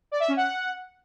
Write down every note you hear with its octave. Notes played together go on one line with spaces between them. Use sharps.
D5
E5
C#4
F#5